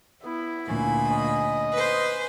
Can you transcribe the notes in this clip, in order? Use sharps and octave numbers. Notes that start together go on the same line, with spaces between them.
B3 E4
D2 A#2 C#4 F5 B5
C#4 D#5
B4 C5